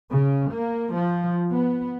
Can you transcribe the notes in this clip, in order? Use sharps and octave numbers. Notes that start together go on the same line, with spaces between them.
C#3
A#3
F3
B3